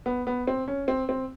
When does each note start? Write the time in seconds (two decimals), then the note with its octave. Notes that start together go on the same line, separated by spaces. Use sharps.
0.06 B3
0.27 B3
0.47 C4
0.68 C#4
0.88 C4
1.09 C4